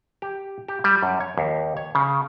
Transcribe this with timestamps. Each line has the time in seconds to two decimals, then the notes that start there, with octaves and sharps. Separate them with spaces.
0.22 G4
0.68 G4
0.84 G3
1.02 F#2
1.20 C#5
1.38 D#2
1.77 C#5
1.95 C#3